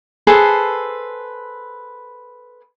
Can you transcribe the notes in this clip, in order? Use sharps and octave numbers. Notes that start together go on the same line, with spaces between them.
G#4 A4 B4 C5